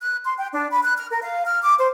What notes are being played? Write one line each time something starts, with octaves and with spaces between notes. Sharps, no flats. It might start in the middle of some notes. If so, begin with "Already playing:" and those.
F#6
C6
G5
D4
B5
F#6
F6
A#4
F5
F6
D6
C5